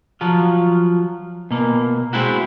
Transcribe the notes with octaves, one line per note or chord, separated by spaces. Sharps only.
F3 F#3 F4
B2 A#3
G#3 C4 E4 F#4